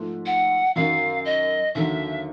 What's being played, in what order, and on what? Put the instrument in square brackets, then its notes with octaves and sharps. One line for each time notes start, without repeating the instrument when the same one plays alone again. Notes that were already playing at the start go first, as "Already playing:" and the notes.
Already playing: [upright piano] G#2 F3 A3
[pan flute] F#5
[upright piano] F#2 D#3 F#3 [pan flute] F5
[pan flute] D#5
[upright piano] D#2 D3 F#3 [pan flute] E5